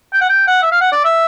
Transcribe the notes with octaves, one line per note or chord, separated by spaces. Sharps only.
G5
F#5
G5
F#5
E5
F5
F#5
D5
E5